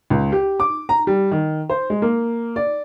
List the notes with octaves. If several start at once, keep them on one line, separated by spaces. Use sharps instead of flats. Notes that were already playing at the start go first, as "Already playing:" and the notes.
C#2
G4
D6
A#5
G3
D#3
C5
G#3
A#3
D5